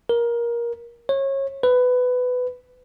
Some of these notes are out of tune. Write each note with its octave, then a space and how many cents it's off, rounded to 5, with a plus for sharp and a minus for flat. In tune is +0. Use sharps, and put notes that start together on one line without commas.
A#4 +20
C#5 -25
B4 +15